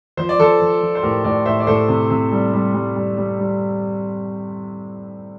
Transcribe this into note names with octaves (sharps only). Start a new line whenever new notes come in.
F3 C5
D5
F3 A4 C5
F3
F3
C5
A2 G4 A#4
A2 A#4 D5
A2 C5 E5
D5
A2 A4 C5
C3
C3
G3
G3
G3
G3
G3
G3